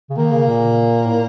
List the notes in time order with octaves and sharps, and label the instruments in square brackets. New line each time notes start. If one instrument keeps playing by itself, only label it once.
[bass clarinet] C#3
[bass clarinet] D#3 [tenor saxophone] A#3
[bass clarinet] C#3
A#2
A2